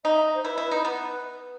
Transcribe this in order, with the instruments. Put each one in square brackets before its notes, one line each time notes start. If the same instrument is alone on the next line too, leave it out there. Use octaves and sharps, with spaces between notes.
[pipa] D#4 [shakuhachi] D#5
[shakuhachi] E5
D#5
C5
[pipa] E4 [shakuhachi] B4
[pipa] E4
[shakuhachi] B4
[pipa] D#4
[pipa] B3 [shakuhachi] B4